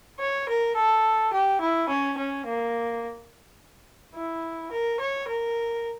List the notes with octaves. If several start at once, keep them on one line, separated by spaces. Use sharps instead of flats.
C#5
A#4
A4
G4
E4
C#4
C#4
A#3
E4
A#4
C#5
A#4